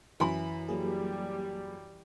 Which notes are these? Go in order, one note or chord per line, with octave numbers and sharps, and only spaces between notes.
F#2 E3 B5
F#3 G3 A#3 G#4